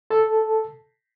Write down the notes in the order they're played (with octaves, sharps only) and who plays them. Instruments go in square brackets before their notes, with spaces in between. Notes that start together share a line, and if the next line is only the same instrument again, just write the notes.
[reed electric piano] A4 A5